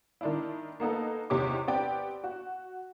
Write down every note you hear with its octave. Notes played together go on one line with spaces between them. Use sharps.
D#3 D4 E4
A#3 B3 D#4 A4
E2 C3 D#4 G4 C#5 D6
B3 C4 G4 D5 G5
F#4